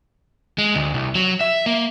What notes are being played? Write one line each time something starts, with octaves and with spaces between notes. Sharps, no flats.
G#3
D2
C2
F#3
E5
A#3